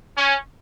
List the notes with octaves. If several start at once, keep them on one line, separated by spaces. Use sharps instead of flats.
C#4